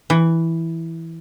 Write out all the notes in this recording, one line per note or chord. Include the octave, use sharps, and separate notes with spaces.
E3